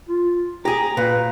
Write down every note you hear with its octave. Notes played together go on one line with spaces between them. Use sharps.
F4
G4 G#4 A#5
A#2 B4